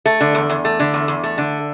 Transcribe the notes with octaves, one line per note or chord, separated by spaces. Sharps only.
A3
D3
E2
E2
A3
D3
E2
E2
A3
D3